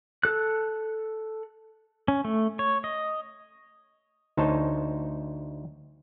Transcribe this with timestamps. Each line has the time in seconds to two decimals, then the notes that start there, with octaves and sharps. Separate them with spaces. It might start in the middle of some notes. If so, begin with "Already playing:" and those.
0.24 A4 F#6
2.08 C#4
2.25 A3
2.59 C#5
2.84 D#5
4.37 D2 D#4 C5 C#5 A5